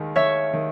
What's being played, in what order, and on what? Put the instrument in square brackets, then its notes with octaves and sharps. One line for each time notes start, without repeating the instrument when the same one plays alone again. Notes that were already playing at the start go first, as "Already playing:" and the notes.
Already playing: [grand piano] D#2 D#3 G#3
[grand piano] D#3 [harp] C#5 E5
[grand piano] D#3